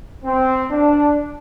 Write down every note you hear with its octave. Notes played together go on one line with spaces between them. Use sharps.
C4
D4